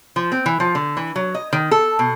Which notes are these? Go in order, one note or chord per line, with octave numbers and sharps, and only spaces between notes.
F3
C4
E3
F3
D3
E3
F#3
D#5
D#3
A4
B2